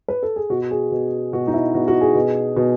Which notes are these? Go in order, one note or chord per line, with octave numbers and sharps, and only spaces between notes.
B4
A4
G#4
B2 F#4
G#4
B2
B2 F#4
D#4
E4
B2 F#4
F#4
G#4
B2
B2